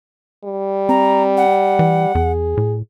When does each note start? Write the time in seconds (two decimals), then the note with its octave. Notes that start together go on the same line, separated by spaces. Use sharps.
0.44 G3
0.89 C4 A#5
1.37 F#5
1.79 E3
2.15 E2 G#4
2.57 A2